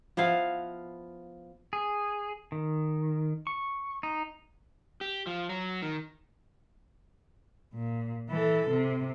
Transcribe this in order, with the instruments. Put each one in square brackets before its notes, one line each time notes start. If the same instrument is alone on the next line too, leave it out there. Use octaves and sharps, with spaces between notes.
[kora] F3 B3 E4 F5
[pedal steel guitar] G#4
D#3
C#6
D#4
[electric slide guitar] G4
F3
F#3
D#3
[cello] A#2
E3 A4
C3